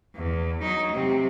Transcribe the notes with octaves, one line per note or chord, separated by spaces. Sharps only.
E2
F#3 D#4
C3 F#3